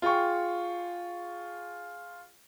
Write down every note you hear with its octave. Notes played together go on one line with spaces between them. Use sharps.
F4 G#4 G5 C#6